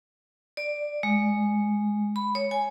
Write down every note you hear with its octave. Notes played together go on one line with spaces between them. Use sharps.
D5
G#3
B5
C#5
G#5